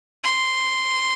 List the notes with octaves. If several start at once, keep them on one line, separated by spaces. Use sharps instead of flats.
C6